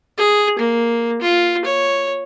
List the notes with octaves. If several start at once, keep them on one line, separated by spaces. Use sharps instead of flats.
G#4
A#3
F4
C#5